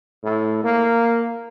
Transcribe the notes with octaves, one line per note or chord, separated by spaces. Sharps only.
A2
A#3